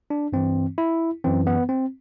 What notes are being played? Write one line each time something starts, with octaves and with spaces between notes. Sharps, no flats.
D4
G2 E3 C4
E4
F#2 E3 C4
B3
C4